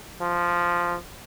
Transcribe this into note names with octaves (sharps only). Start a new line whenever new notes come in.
F3